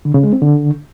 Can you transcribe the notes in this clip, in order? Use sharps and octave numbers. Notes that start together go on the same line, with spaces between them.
D3
C#3
G#3
C4
D3